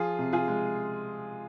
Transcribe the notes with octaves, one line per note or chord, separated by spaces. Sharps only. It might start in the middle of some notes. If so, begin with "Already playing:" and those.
Already playing: F3 F4 G#4
C3
F4 G#4
G#3